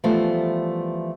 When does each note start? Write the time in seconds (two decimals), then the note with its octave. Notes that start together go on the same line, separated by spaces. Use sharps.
0.04 E3 F3 G3 A3 B3 C5